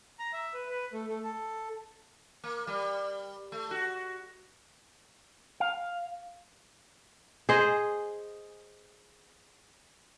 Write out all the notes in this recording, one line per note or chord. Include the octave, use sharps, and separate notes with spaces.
A#5
E5
B4
B4
A3
A3
A4
A#3
G3
A3
F#4
F5
G#4 C5 D#5